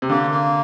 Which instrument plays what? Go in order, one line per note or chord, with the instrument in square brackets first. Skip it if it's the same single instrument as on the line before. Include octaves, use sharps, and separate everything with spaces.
[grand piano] C3
[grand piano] D3 [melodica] A#3
[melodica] A#3